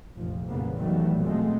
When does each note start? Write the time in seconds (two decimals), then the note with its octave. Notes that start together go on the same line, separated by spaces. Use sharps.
0.16 F1 A#1 F2 F3
0.48 A#2 C#3 E3 G3 A#3 B3
0.77 D#3 E3 F#3 G3 A3 B3
1.20 B2 F3 G#3 A3 B3 C4